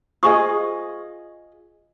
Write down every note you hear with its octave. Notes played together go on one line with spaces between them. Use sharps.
F4 G#4 C5 D#5 C#6 D#6